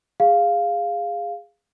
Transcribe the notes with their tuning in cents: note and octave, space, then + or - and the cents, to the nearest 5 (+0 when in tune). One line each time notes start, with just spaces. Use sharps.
G#4 -15 F5 +0